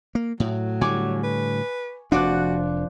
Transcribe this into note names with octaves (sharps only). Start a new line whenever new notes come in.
A#3
A2 F#3
A2 D3 G3 G#5 C#6 D6
B4
F1 F3 D4 F#4 D5 F#6